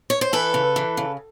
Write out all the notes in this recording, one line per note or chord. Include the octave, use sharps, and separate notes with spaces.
C#5
C5
E3 A4 B4
C#3
E3
C#3